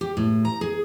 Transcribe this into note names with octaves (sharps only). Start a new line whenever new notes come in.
G4
A2
A#5
G#4